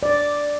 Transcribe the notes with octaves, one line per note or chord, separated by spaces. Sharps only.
D5